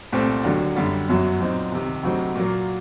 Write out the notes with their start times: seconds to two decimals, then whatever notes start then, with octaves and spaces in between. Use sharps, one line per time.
0.12 C2 A#2 A3 C4
0.44 D#2 D3 F#3
0.76 F#2 D3 G3
1.08 G1 F#2 F#3
1.39 A#2 F#3 C4 D#4
1.72 C2 C3 D#3
2.03 D2 C3 F#3 C4 D#4
2.35 A#2 F#3 A#3